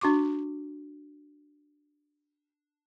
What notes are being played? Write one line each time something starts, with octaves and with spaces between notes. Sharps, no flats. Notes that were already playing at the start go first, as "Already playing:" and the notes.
D4 F#4 C#6 D6